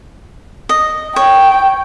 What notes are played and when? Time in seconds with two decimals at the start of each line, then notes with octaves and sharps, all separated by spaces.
0.69 D#5
1.16 C#5 G5